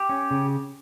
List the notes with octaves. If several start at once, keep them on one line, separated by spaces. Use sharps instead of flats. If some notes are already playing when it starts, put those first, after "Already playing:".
Already playing: G4
C#4
C#3